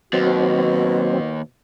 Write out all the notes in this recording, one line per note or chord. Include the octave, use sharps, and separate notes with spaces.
D#2 B2 F#3 C4 F#4